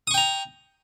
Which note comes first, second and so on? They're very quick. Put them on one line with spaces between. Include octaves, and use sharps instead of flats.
D#6 C#6 G5 A#5